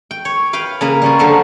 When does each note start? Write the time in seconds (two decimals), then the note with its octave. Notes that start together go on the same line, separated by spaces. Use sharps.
0.11 G5
0.25 C#5
0.53 B4 F5 G5
0.81 C#3 A#3 B4
1.02 G3 C#4 F4
1.19 D3 F#3 C5